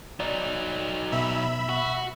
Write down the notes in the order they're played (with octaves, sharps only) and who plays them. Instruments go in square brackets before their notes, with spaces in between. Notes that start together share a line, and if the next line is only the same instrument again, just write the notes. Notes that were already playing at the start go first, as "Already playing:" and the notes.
[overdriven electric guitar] F#3 D#4 [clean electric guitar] D5
[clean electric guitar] B2 [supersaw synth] E5 B5
[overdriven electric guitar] F#4